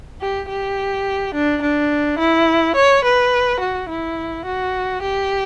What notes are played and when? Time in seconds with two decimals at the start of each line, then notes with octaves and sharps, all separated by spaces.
0.21 G4
0.49 G4
1.34 D4
1.62 D4
2.19 E4
2.75 C#5
3.04 B4
3.60 F#4
3.89 E4
4.45 F#4
5.02 G4